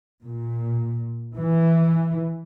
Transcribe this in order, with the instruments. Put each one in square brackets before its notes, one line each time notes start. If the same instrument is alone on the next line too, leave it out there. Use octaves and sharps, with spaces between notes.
[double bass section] A#2
E3